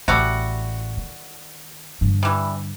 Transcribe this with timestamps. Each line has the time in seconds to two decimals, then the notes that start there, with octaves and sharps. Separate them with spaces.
0.08 A1 G3 A3 F#4
0.97 D#3
2.01 G2 D3
2.23 E3 G3